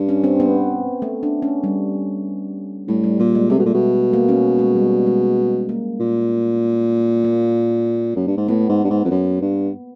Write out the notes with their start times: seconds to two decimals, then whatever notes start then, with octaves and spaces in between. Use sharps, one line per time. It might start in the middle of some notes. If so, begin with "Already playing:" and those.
Already playing: G2
0.09 C#4
0.24 C4
0.40 B3
1.02 A3
1.23 D4
1.42 C#4
1.64 G3
2.88 A2 G3
3.04 G3
3.19 A#2 G3
3.35 G#3
3.50 C3 A3
3.59 B2
3.66 A#2
3.74 B2
4.13 A#3
4.29 C#4
4.59 G#3
4.75 G3
5.07 G#3
5.69 A#3
6.00 A#2
7.24 A#3
8.16 F#2
8.27 G2
8.37 G#2
8.48 A2 B3
8.69 G#2
8.84 G2
8.90 G#2
9.05 F2
9.11 F#2
9.42 G2